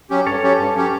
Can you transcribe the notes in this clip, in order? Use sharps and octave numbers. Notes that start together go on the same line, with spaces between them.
F#3 C#4 G4
G2 A4 C#5
F#3 C#4 G4
G2
F#3 C#4 G4